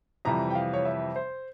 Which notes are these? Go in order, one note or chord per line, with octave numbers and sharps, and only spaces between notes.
F2 C3 E3 G3 A#5
G5
F5
C#5
E5
C5